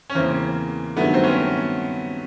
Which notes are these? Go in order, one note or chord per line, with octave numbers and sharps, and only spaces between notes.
C#4
E2 C#3 E3 A#3 C4
G2 D#3 F#3 A3 B3
C4
B3 C#4